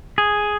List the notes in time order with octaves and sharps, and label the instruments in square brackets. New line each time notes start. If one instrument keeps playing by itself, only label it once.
[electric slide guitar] G#4